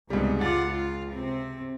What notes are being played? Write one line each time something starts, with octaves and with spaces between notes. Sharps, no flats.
C#2 G#2 C3 G3 B3
F4 F#5 D6 A6
F4
C3 C4